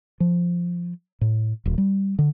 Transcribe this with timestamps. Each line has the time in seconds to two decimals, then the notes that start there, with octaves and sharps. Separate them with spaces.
0.20 F3
1.21 A2
1.65 D#1
1.78 G3
2.19 D3